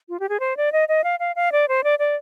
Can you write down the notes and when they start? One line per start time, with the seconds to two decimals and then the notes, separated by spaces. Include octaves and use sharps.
0.09 F4
0.20 G4
0.29 G#4
0.40 C5
0.57 D5
0.72 D#5
0.88 D#5
1.04 F5
1.20 F5
1.36 F5
1.52 D5
1.68 C5
1.84 D5
1.99 D5